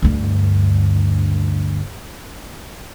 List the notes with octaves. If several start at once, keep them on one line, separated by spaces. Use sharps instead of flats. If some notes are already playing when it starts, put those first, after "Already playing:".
D2 G2